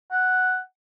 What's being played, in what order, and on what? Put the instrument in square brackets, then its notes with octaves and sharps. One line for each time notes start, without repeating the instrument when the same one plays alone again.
[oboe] F#5